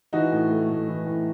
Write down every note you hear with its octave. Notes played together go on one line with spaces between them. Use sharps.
E3 D#4 F#4
A2
A3
A2
E3
A2